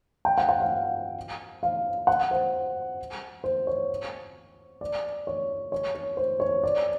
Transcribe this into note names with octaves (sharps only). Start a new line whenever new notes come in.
G5
F#5
F#5
F5
F5
F#5
C5
C5
C#5
D5
C#5
C#5
C#5
C5
C#5
D5